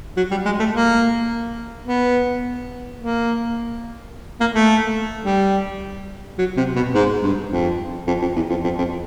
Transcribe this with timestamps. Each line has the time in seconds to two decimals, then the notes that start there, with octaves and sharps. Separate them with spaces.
0.17 F#3
0.31 G3
0.45 G#3
0.59 A3
0.74 A#3
1.86 B3
3.00 A#3
4.41 A#3
4.54 A3
5.25 G3
6.39 F#3
6.57 C3
6.76 B2
6.95 G#2
7.23 G2
7.51 F2
8.08 F2
8.22 F2
8.36 E2
8.50 F2
8.64 F2
8.78 F2